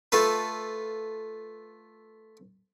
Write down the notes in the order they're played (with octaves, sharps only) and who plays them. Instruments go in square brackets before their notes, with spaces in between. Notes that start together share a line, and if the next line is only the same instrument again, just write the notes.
[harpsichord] A3 F4 A4 B4